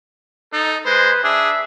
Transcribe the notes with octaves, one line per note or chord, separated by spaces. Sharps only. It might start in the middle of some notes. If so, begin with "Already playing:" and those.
D#4 A4
G#3 B4 C5
D4 G#4 E5